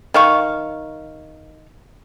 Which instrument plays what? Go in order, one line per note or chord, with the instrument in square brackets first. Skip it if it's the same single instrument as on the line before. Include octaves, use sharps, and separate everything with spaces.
[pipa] D#3 F5 C#6